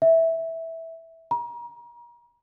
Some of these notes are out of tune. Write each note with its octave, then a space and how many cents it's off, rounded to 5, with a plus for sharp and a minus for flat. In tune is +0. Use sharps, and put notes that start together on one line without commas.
E5 -10
A#5 +35